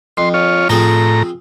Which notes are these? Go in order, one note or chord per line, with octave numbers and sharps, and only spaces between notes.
F2 C6
F4 C#5
A2 F3 C4 G#4 A#5